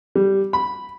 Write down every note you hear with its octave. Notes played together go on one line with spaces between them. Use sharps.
G3
B5